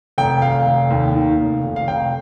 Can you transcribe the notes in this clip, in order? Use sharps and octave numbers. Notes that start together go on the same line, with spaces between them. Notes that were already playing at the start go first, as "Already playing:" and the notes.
F1 G5
F1 F5
F1
D#2
D#3
F1
F1
F5
F1 G5